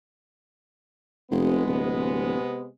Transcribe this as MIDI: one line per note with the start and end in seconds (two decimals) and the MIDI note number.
1.31 1.63 29
1.31 2.68 48
1.31 2.68 56
1.31 2.68 59
1.67 2.36 26